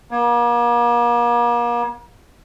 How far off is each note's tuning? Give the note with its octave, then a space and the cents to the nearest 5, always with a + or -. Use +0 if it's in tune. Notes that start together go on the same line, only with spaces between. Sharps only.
A#3 +40